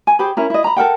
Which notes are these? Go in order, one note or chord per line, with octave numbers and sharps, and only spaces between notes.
G#5
G4 G#4 C5 B5
C#4 E4 A#4
E4 D#5
A#5 B5
A4 A#4 F#5 G5